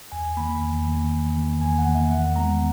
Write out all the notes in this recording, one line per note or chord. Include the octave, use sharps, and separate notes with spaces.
E2 G#5
D#3 A#3 B5
E2
D#3 A#3
E2
D#3 A#3
E2 G#5
F#5
D#3 A#3
E5
E2 F#5
D#3 G#3 B3 A#5